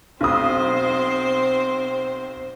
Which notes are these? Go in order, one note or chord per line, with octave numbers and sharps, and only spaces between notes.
B1 C4 C5 D#6